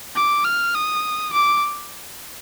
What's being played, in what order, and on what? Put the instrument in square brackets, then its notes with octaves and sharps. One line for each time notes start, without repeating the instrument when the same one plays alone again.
[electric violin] D6
F6
D#6
D6